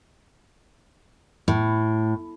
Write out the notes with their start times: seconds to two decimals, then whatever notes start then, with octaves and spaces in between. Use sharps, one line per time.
1.48 A2